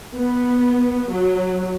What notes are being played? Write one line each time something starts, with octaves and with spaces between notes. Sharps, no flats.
B3
F#3